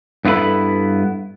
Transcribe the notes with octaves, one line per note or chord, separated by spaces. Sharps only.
G2 B3 E4 G#4 A4 B5